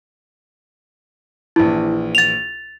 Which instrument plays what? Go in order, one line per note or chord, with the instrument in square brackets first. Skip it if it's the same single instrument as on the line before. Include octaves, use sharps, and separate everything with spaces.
[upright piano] A#1 E3 [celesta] E4
[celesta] A6 F7